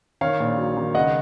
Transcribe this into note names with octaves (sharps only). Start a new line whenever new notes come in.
D#3 C#5 F5
A#1
F#3
D#3
C#2 D#5 F#5